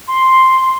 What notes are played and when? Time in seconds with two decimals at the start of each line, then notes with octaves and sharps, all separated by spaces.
0.08 C6